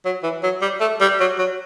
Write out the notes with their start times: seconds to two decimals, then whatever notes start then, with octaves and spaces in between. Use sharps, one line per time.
0.05 F#3
0.23 E3
0.43 F#3
0.62 G3
0.81 A3
1.01 G3
1.20 F#3
1.39 F#3